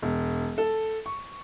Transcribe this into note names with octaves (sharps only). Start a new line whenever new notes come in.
E1
A4
C#6